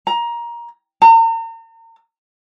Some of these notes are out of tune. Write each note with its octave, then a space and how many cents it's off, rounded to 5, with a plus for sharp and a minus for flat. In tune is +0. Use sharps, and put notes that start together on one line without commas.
A#5 +20
A#5 -40